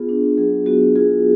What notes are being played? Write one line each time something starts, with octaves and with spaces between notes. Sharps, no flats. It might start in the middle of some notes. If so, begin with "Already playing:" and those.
Already playing: B3 F4 G#4
D4
F#3 G#4
B3 F#4
F4 G#4